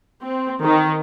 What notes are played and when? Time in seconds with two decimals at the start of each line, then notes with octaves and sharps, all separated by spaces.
0.21 C4
0.61 D#3